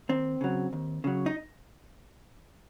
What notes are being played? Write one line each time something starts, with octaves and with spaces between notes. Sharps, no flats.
D#2 C4
C#3 F#3
D#2
C#3 F#3
D#4